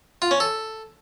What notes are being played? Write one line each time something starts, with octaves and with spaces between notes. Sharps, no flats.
F4
C#4
A4